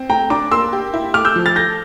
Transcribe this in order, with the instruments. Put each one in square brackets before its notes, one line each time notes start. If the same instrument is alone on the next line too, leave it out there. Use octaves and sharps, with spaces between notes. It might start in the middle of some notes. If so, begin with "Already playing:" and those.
Already playing: [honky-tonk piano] C4
[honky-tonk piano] A3 [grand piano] G5 A#5
[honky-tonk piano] D4 [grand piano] A#5 D6
[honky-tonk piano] A#3 [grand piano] C6 E6
[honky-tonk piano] G4
E4
[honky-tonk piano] A3 [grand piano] D6 F6
[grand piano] E6 G6
[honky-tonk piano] F3
[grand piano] F6 A6
[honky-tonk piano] A4 [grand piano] G6 A#6